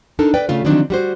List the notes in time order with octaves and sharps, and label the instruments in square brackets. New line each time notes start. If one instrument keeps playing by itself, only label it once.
[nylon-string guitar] D4 D#4 A4 A#4
B4 D5 G5
C#3 A3 F4
D3 D#3 F3 F#3 C4 D4
G3 F#4 C5